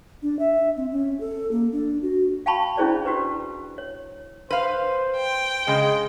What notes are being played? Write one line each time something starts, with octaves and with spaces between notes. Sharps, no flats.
D4
E5
C4
C#4
A4
A#3
D4
F#4
F5 G5 A5 B5 C#6
C#4 D4 E4 G#4 C5 D5
F#4 G4 B4 C5
C#5
B4 C5 F5
G5
C#3 G#3